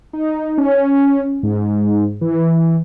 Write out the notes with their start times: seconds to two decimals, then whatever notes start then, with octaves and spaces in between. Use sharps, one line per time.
0.13 D#4
0.58 C#4
1.43 G#2
2.21 E3